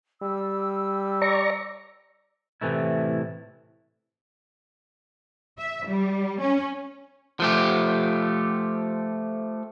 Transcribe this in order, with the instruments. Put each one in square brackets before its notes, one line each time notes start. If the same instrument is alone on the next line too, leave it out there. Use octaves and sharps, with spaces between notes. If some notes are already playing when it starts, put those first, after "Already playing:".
[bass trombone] G3 [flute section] E6
[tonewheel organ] D5 A#5 C#6
[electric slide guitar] A2 C3 E3 A3 E4
[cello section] E5
G3
C#4
[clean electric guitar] F3 A3 G4